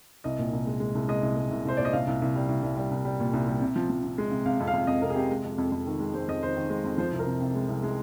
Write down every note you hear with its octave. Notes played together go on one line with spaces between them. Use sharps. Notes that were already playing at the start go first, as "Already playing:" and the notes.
C2 D#5
A#2
C2
G#3
G#3
C2
G#3 D#5
C2
G#3
C2
C2 C5
A#2 D5
D#5
C2 F5
C2
C2
G3
C2
C2
G3
C2
G3
A#2
C2
G3
C3
F3
F3
C3
G#3
C3
C3 F5
F2
F5
F2
F2 D#5
C3 A#4
G#4
C3 G4
G#3
F2
F2
F2
D#3
G#3
G#3 C5
F2 D#5
D#3 C5
D#3
G#3
F2
F3 C5
C2
A#4
C3
C3
G#3
C2
G#3